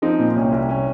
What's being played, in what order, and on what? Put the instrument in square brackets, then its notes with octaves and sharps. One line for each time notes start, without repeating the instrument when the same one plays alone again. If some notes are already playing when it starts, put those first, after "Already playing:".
[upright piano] F3 C4 D#4
A#2
C2 C#4
C2
C#4